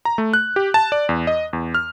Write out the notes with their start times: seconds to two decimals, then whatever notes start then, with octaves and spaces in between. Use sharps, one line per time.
0.05 A#5
0.18 A3
0.34 F#6
0.56 G4
0.74 A5
0.92 D5
1.09 E2
1.27 D#5
1.53 E2
1.75 F6